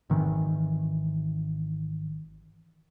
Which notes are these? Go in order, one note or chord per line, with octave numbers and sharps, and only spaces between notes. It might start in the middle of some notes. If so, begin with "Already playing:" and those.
G#1 D#3 E3